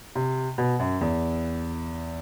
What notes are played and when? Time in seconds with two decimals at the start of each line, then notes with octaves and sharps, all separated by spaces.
0.15 C3
0.58 B2
0.79 F#2
1.01 E2